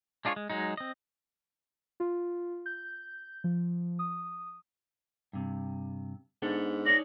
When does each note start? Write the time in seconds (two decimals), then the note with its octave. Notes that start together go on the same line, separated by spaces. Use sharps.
0.25 G#3 D4 F4 G#4 C#5
0.36 G#3
0.50 F#3 G#3 D#4
0.77 C4 D#5
2.00 F4
2.66 G6
3.44 F3
3.99 D#6
5.33 G2 C3
6.42 G#2 B3 D4 A4
6.86 D#4 C#5 D5 A#6